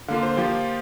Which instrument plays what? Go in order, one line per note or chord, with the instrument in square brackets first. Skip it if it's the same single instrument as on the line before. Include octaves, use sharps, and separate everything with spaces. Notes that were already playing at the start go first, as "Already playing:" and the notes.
[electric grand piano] D3 A#3 F4 F5
C5
F3 A#3 F4 G4